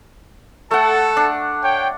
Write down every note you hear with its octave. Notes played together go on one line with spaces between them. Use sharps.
A3 A4 F#5 A5
D4
C#5 G5